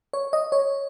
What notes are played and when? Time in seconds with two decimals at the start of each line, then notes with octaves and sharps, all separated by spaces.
0.13 C#5
0.33 D#5
0.52 C#5